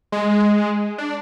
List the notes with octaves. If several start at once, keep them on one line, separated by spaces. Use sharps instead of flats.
G#3
D4